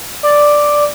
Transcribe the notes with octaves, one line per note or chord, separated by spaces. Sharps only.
D5